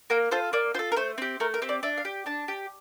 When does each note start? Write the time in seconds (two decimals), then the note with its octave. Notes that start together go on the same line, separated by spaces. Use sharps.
0.10 A#3 A#4
0.31 F4 A4 C5
0.53 A#3 D5
0.74 F4 C5
0.79 A4
0.92 A#4
0.97 A3 C5
1.18 C4 G4
1.40 A3 A#4
1.54 A#4
1.62 C4 G4
1.69 D5
1.83 D4 E5
1.98 F5
2.05 G4
2.26 D4 A5
2.48 G4